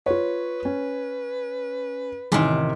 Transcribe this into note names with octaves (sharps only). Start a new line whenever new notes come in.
F4 B4 C#5
C#4
A1 C3 D#3 G#5